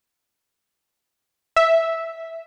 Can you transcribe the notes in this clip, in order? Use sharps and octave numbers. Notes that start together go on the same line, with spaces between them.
E5